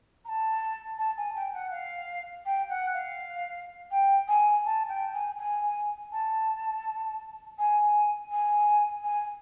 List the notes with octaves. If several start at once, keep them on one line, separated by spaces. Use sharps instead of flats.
A#5
A5
A5
G#5
G5
F#5
F5
G5
F#5
F5
G5
G#5
A5
G5
G#5
G#5
A5
G#5
G#5
G#5